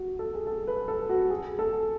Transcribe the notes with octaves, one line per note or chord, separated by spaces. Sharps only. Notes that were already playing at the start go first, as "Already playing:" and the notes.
Already playing: F#4
A4
G#4
A4
B4
A4
F#4
G#4
A4